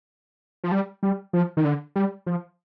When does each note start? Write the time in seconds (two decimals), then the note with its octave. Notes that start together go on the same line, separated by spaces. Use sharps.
0.64 F3
0.72 G3
1.03 G3
1.33 F3
1.57 D#3
1.64 D3
1.96 G3
2.26 F3